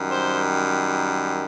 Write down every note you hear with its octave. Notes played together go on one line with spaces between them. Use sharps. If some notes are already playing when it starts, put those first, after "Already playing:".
Already playing: F#2 D#3 G3
C5